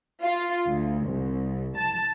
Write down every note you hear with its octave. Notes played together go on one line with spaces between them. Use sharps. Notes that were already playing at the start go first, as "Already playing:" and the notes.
F4
D2
C2
A5